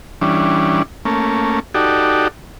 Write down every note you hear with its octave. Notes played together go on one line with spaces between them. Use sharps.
E3 G3 C#4 D4
A3 A#3 C#4
D#4 F#4 G4 A4 D5